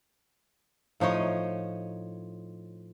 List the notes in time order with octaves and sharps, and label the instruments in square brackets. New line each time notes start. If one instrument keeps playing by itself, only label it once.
[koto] A2 F3 D#4 C#5 D#5